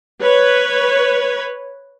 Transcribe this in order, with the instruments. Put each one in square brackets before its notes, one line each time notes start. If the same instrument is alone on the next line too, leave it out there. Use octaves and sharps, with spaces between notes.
[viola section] B4 C#5